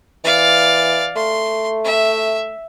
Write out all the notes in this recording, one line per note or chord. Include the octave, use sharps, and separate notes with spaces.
E3 D5 F5
A3 C6
E5